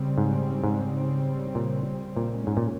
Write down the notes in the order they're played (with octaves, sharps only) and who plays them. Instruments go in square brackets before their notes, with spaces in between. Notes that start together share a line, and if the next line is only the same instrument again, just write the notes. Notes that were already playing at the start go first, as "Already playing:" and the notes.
Already playing: [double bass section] C#3 G3 C4
[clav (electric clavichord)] G#2
G#2
A#2
A#2
[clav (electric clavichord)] G#2 [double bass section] G#3 C#4
[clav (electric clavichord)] A#2